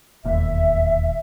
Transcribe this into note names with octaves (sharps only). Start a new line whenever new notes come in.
E1 D#2 A#2 E5